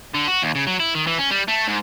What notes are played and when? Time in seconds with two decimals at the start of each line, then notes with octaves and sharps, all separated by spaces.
0.15 D3
0.28 F#4
0.42 D#2
0.55 C#3
0.67 F#3
0.80 E4
0.95 D#3
1.07 E3
1.19 C#4
1.31 G3
1.48 A3
1.68 G#2